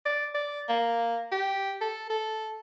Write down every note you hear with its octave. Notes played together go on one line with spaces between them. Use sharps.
D5
D5
A#3
G4
A4
A4